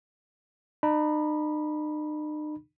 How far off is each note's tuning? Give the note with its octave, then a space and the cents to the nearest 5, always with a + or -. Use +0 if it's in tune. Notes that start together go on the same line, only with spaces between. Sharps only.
D#4 -45 B5 -20